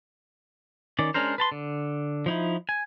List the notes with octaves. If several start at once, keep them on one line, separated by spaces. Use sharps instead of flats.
D#3 C#4 D5
G#3 C#4 D4 A#4 C5
B4 A5 C6
D3
F3 D#4 E4
G#5